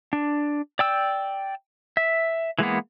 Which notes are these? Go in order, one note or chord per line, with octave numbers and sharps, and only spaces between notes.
D4
D5 G5 E6
E5
E3 G#3 A#3 B3